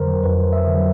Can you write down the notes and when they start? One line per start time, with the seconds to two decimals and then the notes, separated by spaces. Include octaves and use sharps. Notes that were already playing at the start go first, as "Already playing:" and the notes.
Already playing: F2 D3 F#3 A#4 C5
0.23 F2 B4
0.53 E5
0.67 D3 F#3